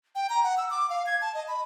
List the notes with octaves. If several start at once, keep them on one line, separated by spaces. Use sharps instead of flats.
G5
A#5
F#5
E6
D6
F5
G#6
A5
D#5
B5